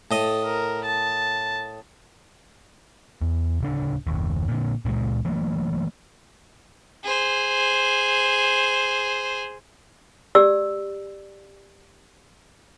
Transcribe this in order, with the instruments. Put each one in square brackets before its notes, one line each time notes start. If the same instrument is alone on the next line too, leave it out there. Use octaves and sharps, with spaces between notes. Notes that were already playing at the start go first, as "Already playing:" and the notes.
[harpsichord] A2 D#5 D#6 [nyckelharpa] A4
[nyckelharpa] A#4
A5
[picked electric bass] E2
D1 C#3 D4
F#1 D#2
A#2 D3
C#2 A#2 G#3
E3 F#3 A3 A#3
[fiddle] G#4 C5
[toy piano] G4 D5 E6